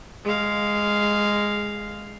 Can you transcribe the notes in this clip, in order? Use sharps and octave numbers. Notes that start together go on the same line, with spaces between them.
G#3 F5